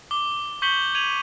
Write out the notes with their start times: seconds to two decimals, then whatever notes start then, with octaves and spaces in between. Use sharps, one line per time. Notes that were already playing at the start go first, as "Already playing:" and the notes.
0.11 D6 G7
0.62 C#6 G6 B6 C#7 F#7 G7
0.95 G#6 D#7 F7 F#7